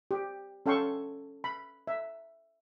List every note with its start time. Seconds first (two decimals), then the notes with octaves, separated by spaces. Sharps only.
0.11 G4
0.66 C#4 A4 F5 G5 C6 C#6
1.44 B5
1.87 E5